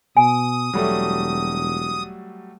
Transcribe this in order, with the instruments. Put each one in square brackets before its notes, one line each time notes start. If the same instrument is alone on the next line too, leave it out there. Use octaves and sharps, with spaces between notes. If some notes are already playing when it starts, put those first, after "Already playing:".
[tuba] B2 [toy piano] G#5 [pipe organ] D#6
[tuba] E1 [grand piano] F#3 G3 A3